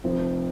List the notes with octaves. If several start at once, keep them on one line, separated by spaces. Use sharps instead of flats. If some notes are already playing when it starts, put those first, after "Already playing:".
F1 F2 F3 C4